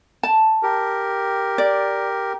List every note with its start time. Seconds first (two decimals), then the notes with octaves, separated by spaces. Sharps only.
0.23 A5
0.63 G4 A#4
1.58 D5